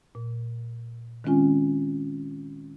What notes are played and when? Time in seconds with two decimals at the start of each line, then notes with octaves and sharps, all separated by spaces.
0.15 A#2
1.24 D#3 G#3 C4 C#4 F4 G#5